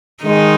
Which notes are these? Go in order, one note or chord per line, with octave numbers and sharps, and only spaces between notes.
D#3 G#3 D#4